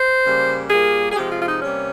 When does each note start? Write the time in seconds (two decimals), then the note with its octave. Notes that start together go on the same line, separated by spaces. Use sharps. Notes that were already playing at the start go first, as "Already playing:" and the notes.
Already playing: C5
0.24 C#3 G3 A#3
0.70 A#2 G3 A#3 G#4
1.12 G#4
1.16 C3 F3 G#3 G4
1.32 F4
1.42 F4
1.47 D#4
1.62 C3 G3 A#3 C#4